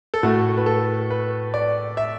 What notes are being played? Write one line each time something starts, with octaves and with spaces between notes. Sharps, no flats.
A4
A2 A3 F#4
B4
A4
B4
D5
E5